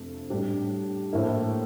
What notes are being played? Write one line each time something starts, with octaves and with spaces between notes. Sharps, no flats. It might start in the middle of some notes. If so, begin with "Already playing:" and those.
Already playing: F2 C3 F3 A3 D4
A2 G3 D4 G4
A2 F3 A#3 E4